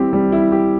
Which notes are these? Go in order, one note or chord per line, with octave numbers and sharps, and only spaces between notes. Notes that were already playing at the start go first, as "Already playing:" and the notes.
Already playing: G3 C4 E4 G4
G3
E4
G4